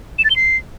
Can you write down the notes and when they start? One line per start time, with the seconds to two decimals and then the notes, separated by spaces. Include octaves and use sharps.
0.19 E7
0.24 A6
0.30 G7
0.36 C7